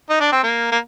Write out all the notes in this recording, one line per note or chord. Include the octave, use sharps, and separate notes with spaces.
D#4
D4
C4
A#3
A#3